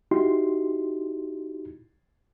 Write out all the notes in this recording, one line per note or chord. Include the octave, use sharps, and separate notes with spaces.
D#4 E4 F#4 G4 C6